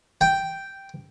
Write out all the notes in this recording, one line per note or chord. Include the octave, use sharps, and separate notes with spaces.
G5